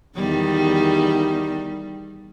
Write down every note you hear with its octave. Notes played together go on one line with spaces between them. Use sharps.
E2 D#3 G3